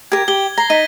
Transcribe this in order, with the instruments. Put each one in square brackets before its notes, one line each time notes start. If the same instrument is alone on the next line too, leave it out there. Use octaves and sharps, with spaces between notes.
[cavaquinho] G4 A#4 [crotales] G#6
[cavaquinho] G4 [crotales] G7
[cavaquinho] A#5 [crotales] A#6 C7
[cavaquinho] D#4 [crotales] B6 D#7